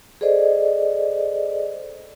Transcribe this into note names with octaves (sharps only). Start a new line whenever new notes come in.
G#4 A4 C5 D5 D#5